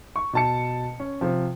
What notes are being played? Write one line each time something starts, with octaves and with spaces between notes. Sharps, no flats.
C#6
B2 A5 C#7
C#4
C3 F3